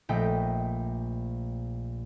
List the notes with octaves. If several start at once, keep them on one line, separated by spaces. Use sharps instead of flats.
A#1 A3 D#5 G5 B6